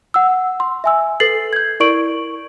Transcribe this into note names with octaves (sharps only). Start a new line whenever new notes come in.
F#5 E6
C6
E5 G#5 E6
A4 B4 A6 C7 F#7
G6 G#6
E4 A#4 D5 C#6 D7 F#7